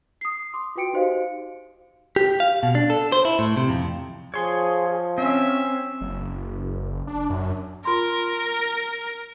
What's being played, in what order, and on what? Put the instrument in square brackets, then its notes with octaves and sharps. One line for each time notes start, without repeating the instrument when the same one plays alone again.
[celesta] D#6 C7
C6 D6
F4 F#4 B4 G5 C#7 D7
D#4 F#4 G4 C5 D#5 F5
[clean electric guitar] G4
F5
B2
D4
A4
C5
E4
A2
C3
F2
[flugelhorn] F3 [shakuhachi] G#4 [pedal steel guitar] C#5 C6
[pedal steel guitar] C4 [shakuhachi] C#4 [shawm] E5
[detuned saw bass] F#1
D4
F#2
[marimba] F4 B5 C6 [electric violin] A#4